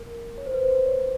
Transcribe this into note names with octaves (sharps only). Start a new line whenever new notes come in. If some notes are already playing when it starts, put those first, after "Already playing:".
Already playing: A#4
C#5
C5
B4
C5
C#5